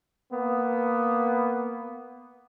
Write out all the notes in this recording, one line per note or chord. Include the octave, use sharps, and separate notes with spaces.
A#3 B3